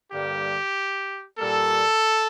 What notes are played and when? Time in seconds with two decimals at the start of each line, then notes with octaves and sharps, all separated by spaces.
0.12 G2 D3 G3 A#3 G4
1.39 A#2 G3 A#3 A4